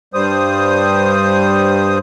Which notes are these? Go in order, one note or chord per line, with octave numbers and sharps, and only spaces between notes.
G2 G3 C5 D#6